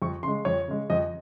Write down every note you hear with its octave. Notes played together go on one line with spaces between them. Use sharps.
F2 C#6
C#3 G#3 C6
F2 C#5
C#3 G#3
F2 D#5